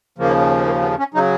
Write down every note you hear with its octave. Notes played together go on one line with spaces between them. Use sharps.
D#2 C#3 F3 A#3
A#3
B3
C#4
C#3 F#3 D#4